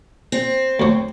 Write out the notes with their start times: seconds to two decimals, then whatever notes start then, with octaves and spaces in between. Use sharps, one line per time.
0.32 C4
0.80 D2 F#3